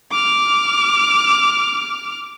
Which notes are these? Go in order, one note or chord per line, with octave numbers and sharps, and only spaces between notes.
D6 F6